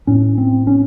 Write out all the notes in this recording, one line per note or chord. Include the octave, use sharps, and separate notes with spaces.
A2 C#4
C4
C#4